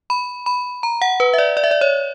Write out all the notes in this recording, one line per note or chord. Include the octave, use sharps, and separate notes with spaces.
B5
B5
A#5
F#5
B4
E5
D5
D5
E5
D5
C#5